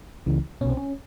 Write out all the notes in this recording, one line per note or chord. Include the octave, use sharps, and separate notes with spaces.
C#2 C#3 E3
C2 B2 C#4
C4
C#4